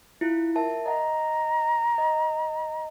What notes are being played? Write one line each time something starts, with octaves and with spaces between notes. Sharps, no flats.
E4 F4
A#4 E5 A5
D#5 F#5 A#5
D#5